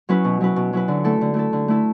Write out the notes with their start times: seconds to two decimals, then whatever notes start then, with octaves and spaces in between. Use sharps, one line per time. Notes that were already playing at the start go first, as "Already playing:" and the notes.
0.09 F#3 C#4 E4 B4
0.24 B2
0.40 F#3 C#4 E4 B4
0.56 B2
0.73 F#3 C#4 E4 B4
0.88 D3
1.04 A3 E4 A4
1.21 D3
1.34 A3 E4 A4
1.53 D3
1.68 A3 E4 A4